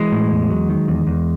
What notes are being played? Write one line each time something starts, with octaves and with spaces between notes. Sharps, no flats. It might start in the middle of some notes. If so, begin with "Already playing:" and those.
Already playing: E3 G#3
A2
E2
F#3
D#3
E2
E2